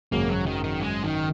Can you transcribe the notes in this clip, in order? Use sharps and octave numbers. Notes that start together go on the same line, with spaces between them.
G#1 F#2 C#3 A#3
F#3
D#3
D#3
G#3
D#3